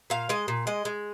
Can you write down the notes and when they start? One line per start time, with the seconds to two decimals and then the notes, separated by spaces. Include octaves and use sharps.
0.10 A#2 F5
0.29 G#3 D#5
0.48 A#2
0.67 G#3 D#5
0.85 G#3